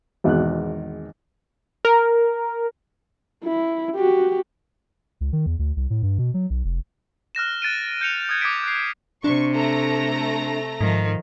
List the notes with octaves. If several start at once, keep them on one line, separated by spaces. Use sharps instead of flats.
G#1 E2 B2 F#6
A#4
E4
F#4 G4
C#2
D#3
E2
D2
C2
A2
G2
B2
F#3
B1
F1
F6 F#6 A#6 E7
F#6 A6 D7 D#7
G6 C#7 F7
D#6 F#6 G#6
D6 D#6 G#6 A6 B6 D7
F#6 C7
C3 D4 C#6
A3 A#5 A#6
G#2 D#3 F3